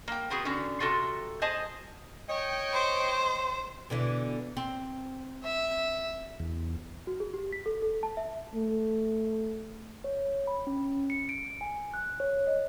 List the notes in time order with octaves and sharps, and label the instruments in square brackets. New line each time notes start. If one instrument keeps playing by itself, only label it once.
[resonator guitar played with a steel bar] A#3 G5
B3 C4 F#4 G#4
D3 C#4 F#4
C3 F4 F#4 A4
G#4 C5 D#5 G#5 A5
[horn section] C#5 D#5 G5
[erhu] C5
[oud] B2 D3 E3
C4
[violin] E5
[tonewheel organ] E2
[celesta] F#4
G#4
G4
B6
A4
A4
A5
E5
[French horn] A3
[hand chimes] C#5
B5
C#4
C#7
D7
G#5
F#6
C#5
D#5